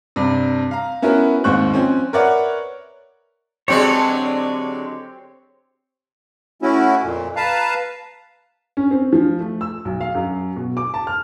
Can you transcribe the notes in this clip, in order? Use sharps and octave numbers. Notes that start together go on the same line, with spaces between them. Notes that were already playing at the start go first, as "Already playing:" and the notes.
G2 C3
F5 A#5
B3 C#4 E4 F#4 A#4
D#2 G#2 C4 C#6 F#6
F3 C4 C#4
A#4 B4 C#5 D5 E5 F#5
D3 F#3 G#3 C4 G4 C#5
A3 C#4 E4 F#4
F2 A#2
B4 F5 A5 A#5
C#4
C4
F3
A3
E6
B1
F5
F#2
B2
D6
A5
F6